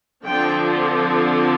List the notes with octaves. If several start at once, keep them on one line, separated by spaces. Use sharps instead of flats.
D3 F3 C4 G5